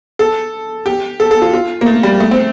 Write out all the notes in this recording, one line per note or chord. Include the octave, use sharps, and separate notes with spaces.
A4
G4
A4
A4
F4
F4
A#3
A3
G3
A3
C4